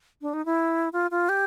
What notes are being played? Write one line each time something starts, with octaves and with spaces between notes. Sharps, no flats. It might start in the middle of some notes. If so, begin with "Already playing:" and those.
D4
D#4
E4
F4
F4
G4